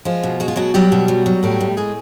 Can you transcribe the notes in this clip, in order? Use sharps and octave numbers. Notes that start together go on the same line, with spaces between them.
F3 G#3 F4
B2
G#3 F#4
F4
B2 F#3 F#4
F#3 G3 G4
B2
F#3
F#3
A2 G3 G4
A2
A2 G#3 G#4